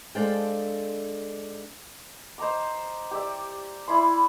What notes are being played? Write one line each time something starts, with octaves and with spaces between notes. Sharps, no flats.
G#3 D4 A4 C5 F5 G5
C5 D#5 A#5 D6
G4 D5 E5
E4 D5 B5 C6